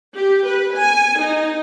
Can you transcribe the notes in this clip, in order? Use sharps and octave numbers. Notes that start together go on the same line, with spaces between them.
G4
B4
G#5
D#4